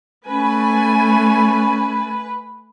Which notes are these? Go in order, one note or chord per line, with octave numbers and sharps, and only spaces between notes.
A3 C#4 B4 G#5